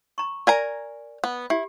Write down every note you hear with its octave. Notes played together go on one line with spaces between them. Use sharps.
A#5 C#6
A#4 D5 G#5 A#5
B3
E4 G4